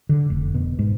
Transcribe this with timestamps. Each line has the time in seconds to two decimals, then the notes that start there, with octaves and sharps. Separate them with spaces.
0.09 D3
0.30 F1
0.55 B2
0.79 G#2